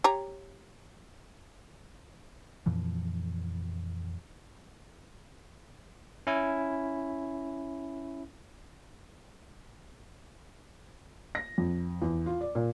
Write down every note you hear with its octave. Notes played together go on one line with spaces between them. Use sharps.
G4 C#5 A#5
F2 A#2 E3 F3
C#4 E4
A#6
F2
E2
F4
D5
A#2